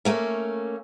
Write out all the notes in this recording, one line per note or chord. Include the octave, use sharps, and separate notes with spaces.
A3 A#3 C#4